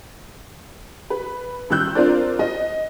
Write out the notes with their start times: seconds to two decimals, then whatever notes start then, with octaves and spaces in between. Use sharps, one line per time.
1.10 B4
1.70 A1 D#3 G3 E6 F#6 G6
1.95 C4 D4 F4 A#4 C5 D5
2.39 D#5